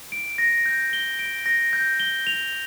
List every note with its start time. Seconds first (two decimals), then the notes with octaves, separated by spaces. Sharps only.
0.12 D7
0.38 A#6
0.66 G6
0.93 G7
1.19 D7
1.46 A#6
1.73 G6
2.00 G7
2.27 F7